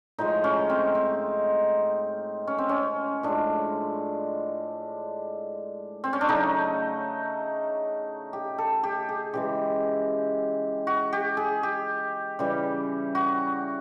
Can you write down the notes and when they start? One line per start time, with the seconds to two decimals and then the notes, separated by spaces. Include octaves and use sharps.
0.18 A2 F3 G#3 D#4
0.44 C#4
0.69 C4
0.95 C4
2.47 C#4
2.58 C4
2.69 C#4
3.23 A2 F3 G#3 D4
6.04 C4
6.13 C#4
6.21 D4
6.28 C#3 F#3 A3 D#4
8.33 G4
8.58 A4
8.83 G4
9.09 G#4
9.33 C#3 E3 G#3 G4
10.87 F#4
11.13 G4
11.37 G#4
11.63 G4
12.39 C#3 E3 G3
13.15 F#4